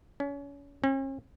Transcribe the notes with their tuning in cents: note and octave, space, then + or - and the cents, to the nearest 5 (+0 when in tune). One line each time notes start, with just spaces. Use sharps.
C#4 +30
C#4 -45